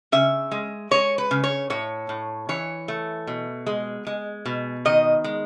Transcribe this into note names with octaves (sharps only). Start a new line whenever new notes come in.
C#3 E5
G#3
G#3 C#5
B4
C#3
C#5
A2 C#5
A2
E3 C#5
A3
B2
G#3
G#3
B2
D#3 D#5
G#3